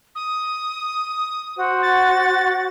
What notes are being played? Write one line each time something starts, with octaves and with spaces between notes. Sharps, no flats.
D#6
F#4 C5
A6